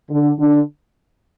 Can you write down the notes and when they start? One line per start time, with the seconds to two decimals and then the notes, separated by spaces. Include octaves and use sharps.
0.11 D3
0.40 D3